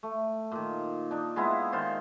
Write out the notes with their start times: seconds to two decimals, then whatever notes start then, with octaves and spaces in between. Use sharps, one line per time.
0.03 A3
0.51 A#2 D#3
1.11 D4 D#4
1.36 G#3 B3 E4 F4
1.72 D#3 F4 C5